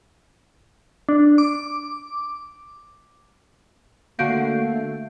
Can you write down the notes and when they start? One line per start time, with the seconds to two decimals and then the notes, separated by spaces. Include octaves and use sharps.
1.09 D4
1.38 D6
4.19 D3 A3 A#3 F#4 F5 G6 C7 D7